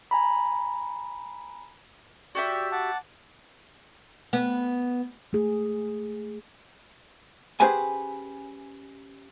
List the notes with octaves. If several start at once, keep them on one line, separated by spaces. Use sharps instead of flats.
G#5 A#5 B5
F#4 G4 D5 E5
F#5 A5 D6
B3
A3 G#4
C#4 G4 G#4 B4 C5 G#5